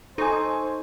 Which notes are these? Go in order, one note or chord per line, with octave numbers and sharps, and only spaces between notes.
D#4 A4 C5 G#5 C#6